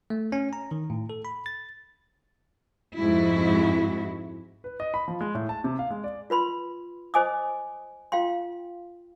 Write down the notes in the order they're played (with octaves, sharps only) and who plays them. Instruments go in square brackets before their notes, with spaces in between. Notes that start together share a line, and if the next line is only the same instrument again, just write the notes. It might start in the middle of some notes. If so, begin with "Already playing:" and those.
[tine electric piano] A3
C#4
A#5
D#3
A2
A4
B5
A6
[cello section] F2 G#2 G#3 E4 F#4
[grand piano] B4
D#5
B5
F3
G#3
A2
A5
C3
F5
G#3
D5
[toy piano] F4 B4 B5 C6
C5 D#5 G#5 D6 D#6
F4 F5 G5 C6